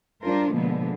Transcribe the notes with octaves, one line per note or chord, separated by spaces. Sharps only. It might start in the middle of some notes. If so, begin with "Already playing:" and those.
G3 D4 F4 A#4 C5
B2 D3 F3 G#3 A#3 B3